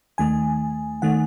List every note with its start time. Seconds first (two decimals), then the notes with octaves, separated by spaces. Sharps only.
0.18 D#2 D#3 A3 G#5
1.02 D#3 A3 F#5